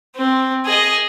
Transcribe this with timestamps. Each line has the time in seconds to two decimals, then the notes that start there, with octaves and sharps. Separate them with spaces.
0.16 C4
0.65 G#4 D#5